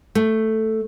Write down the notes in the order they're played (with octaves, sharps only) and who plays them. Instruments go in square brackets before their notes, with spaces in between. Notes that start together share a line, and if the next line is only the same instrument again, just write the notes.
[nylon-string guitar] A3